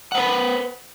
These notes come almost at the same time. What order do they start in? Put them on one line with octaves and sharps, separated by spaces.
F#5 C5 B4